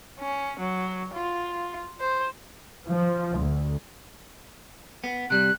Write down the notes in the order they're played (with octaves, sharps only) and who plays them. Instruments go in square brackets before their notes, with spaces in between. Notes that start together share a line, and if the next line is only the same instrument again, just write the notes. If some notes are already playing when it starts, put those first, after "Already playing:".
[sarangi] C#4
F#3
F4
C5
[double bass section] F3
D2
[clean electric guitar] B3
[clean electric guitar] C3 G3 [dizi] F#6